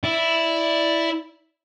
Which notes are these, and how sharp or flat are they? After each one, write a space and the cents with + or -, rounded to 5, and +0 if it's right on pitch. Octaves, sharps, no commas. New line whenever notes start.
E4 +0 D5 +0